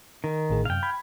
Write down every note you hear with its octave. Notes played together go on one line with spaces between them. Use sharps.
D#3
A1 A2 G#4
F#2 C3 F5 G5
B5 G#6